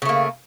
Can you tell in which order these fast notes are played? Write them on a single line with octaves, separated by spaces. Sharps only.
C#3 A3 A#3